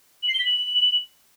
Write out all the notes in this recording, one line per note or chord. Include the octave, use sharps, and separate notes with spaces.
F#7
C7
G7
B6
F#7